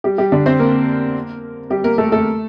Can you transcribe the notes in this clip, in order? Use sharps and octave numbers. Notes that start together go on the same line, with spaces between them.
G3 G4
G3 G4
D3 D4
C4 C5
A#3 A#4
G3 G4
A#3 A#4
A3 A4
A3 A4